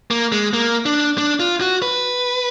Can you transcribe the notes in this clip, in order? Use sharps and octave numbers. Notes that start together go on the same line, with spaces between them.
A#3
G#3
A#3
D4
D4
F4
F#4
B4